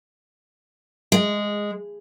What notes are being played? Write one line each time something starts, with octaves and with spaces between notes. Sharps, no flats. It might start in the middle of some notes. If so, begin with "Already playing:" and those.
G#3